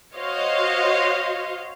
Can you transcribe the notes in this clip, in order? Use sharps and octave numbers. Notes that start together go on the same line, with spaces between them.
F#4 C5 C#5 D#5 F5